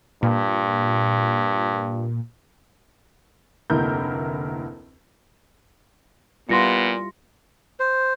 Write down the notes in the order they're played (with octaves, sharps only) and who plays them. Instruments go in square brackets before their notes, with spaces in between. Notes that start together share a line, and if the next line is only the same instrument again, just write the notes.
[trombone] G2 [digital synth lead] A#2
[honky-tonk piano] F1 D2 A#3 E4 A#4 G6
[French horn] A#2 [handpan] G3 E4 F4 [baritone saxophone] B3 [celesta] C6 A#6 C#7
[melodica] C5